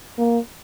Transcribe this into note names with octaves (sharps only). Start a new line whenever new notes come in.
A#3